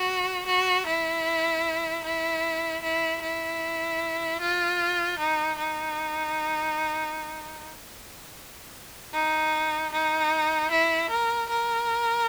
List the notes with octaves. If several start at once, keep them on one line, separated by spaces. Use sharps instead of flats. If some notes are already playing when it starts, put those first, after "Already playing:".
Already playing: F#4
F#4
E4
E4
E4
E4
F4
D#4
D#4
D#4
D#4
E4
A#4
A#4